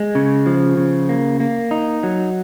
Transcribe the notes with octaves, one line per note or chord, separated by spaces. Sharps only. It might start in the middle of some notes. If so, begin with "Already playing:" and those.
Already playing: G#3
C#3
F3
C#3
A#3
A#3
D#4
F#3